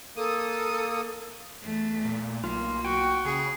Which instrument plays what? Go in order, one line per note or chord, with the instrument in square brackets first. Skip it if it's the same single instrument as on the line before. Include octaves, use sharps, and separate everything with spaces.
[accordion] A#3 D#6 [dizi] A4
[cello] E2 A3
[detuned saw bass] A#2
[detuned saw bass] B1 [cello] A#3 [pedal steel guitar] F4
[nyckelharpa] F#4 [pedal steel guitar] G5
[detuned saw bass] C#3 [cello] G#4